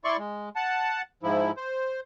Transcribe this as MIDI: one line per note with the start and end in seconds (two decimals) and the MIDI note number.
0.04 0.17 64
0.04 0.17 74
0.04 0.17 84
0.04 0.17 85
0.18 0.49 56
0.56 1.02 78
0.56 1.02 81
1.23 1.51 44
1.23 1.51 53
1.23 1.51 64
1.57 2.00 72